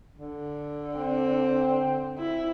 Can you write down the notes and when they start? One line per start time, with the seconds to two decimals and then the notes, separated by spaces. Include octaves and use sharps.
0.18 D3
0.97 C4
2.19 E4